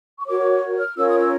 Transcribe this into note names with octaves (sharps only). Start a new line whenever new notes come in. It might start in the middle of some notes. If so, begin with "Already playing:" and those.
C#6
F#4 A#4 C#5 D6
F6
C#4 F4 A#4 C#5 E6
D#6
E6